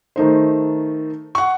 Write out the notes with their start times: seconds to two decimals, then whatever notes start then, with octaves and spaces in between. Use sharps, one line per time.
0.16 D#3 A3 D#4 C5
1.35 F#5 C#6